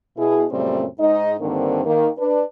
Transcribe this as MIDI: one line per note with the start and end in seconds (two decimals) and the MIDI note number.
0.17 0.45 47
0.17 0.45 64
0.17 0.45 68
0.51 0.85 42
0.51 0.85 46
0.51 0.85 49
0.51 0.85 55
0.51 0.85 57
0.51 0.85 60
0.99 1.34 44
0.99 1.34 63
0.99 1.34 75
1.40 1.85 43
1.40 1.85 50
1.40 1.85 51
1.40 1.85 58
1.40 1.85 60
1.85 2.09 51
1.85 2.09 58
2.18 2.42 62
2.18 2.42 71